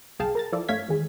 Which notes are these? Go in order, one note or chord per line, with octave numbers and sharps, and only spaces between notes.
G1 C2 G#4 F5 G5 A5
A#4 A#5 A6
F3 E4 F4 A4 D5
G2 A3 C#5 F5 G#6 B6
E2 D#3 G#3